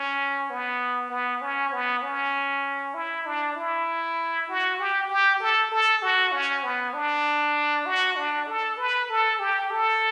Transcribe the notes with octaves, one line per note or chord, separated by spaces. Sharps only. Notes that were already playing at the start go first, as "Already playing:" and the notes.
Already playing: C#4
B3
B3
C#4
B3
C#4
E4
D4
E4
F#4
G4
G4
A4
A4
F#4
C#4
B3
D4
F#4
D4
A4
B4
A4
G4
A4